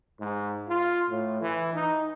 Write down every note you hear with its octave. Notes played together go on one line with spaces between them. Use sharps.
G#2
F4
A2
E3
D#4